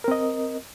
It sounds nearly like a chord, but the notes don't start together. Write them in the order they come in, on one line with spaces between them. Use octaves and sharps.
A#4 C4 D#5